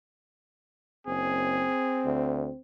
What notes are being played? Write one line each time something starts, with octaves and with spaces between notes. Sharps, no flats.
F#1 C4 G#4
D2